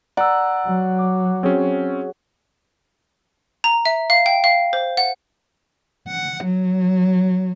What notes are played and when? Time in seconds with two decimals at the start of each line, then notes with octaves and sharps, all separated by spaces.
0.17 D5 F#5 A#5 E6
0.66 F#3
0.99 D6
1.43 C4 C#4 F#4 G#4 C#5
3.64 A#5
3.86 E5
4.10 F5
4.26 G5
4.44 F5
4.73 C5
4.97 F#5
6.08 F#5
6.44 F#3